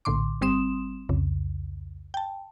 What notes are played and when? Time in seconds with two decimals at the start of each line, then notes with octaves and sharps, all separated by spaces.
0.05 A#1 A2 D3 C6 D6
0.41 G1 G3 C4 C6 D#6 E7
1.09 C2 F2 C#3
2.14 G5 A5